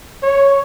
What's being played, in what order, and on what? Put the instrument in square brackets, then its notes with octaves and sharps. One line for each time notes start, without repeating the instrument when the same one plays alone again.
[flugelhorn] C#5